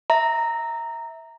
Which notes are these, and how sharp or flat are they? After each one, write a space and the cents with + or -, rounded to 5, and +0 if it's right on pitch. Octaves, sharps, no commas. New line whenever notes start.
E5 -15 A#5 -10